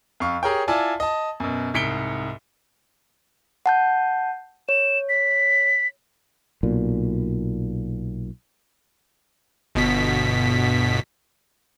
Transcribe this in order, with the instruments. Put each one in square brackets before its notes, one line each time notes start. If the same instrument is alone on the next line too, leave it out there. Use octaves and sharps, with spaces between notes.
[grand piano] F2 F5 C#6
G4 G#4 A#4 C#5 G5
E4 F4 D5 G#5 A5
D#5 A5
F#2 B2
C2 G#2 B6 C#7 D7 G7
[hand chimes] F#5 A5 G6
[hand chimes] C#5 [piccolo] E7
[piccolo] B6
[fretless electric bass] B1 A#2
[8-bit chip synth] G1 B2 B6